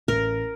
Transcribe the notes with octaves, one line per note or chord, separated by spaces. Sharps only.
A1 A#4